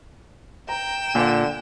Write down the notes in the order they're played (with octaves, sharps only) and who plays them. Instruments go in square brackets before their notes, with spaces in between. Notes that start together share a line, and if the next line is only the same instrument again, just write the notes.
[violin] G5 E7 [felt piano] A#5
[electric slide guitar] A#2 [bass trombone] D3 [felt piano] D5 F5 G#5